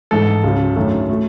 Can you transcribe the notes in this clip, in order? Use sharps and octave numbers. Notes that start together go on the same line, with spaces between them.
G#2 E3 G#3 A4
C#2 C#3 F#3
F#2 D#3 A3
F#3 A3